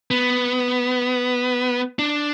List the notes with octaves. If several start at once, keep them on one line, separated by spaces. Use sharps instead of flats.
B3
D4